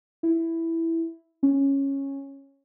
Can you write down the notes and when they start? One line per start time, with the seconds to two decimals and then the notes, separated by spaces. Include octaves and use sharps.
0.23 E4
1.43 C#4